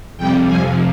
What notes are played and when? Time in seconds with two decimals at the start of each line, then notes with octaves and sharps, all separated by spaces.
0.17 F2 C3 G3 G5
0.46 F2 C3 F3 G#5